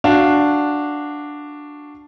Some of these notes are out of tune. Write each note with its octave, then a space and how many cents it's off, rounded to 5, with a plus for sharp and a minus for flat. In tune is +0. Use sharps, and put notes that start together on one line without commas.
D4 +0 F#4 +0 F5 -10